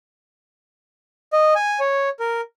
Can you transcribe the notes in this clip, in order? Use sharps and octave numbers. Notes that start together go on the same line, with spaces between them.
D#5
G#5
C#5
A#4